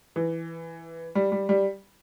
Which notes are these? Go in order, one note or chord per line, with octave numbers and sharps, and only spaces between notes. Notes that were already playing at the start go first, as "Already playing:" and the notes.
E3
G3
G3
G3